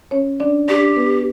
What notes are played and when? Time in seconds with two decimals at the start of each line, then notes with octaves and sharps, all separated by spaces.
0.11 C#4 C#5
0.40 D4 D5
0.68 D4 G4 D5
0.96 B3 B4